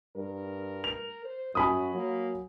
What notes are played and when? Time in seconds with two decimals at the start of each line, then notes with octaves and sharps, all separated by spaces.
0.16 G2 A#4
0.84 F7
1.25 C5
1.55 F#2 F#4 G#5 B5 D#6
1.94 F#3 A#3